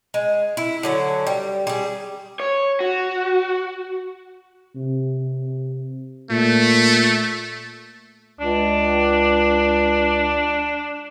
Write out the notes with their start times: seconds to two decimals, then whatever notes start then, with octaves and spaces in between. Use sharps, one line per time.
0.14 G#3
0.57 E4
0.83 D3 F#3 C#4
1.27 G3
1.67 G3 G#4
2.40 C#5
2.80 F#4
4.76 C3
6.30 A#2 A3
8.40 C#2 D4